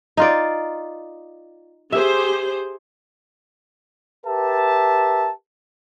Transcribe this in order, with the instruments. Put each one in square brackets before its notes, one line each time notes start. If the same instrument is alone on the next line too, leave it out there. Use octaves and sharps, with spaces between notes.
[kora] D#4 F4 D5
[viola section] G4 G#4 C5 [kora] E5
[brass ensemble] G4 A#4 B4 E5 A5